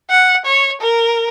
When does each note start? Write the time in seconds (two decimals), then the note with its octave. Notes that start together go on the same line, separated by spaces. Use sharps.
0.10 F#5
0.46 C#5
0.81 A#4